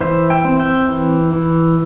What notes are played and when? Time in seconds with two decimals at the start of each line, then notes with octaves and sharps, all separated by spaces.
0.01 E3 C5 E5
0.30 E5 G5
0.45 C4
0.60 E5 G5
0.89 E3
1.33 E3